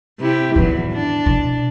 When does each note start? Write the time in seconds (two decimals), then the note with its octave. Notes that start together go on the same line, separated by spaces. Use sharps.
0.19 C3 E4 G4
0.56 E2 A2 D#3 E3 F#3
0.92 D4
1.26 B2